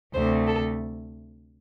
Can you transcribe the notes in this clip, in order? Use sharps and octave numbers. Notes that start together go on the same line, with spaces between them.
D2 C3 A3 C5
A4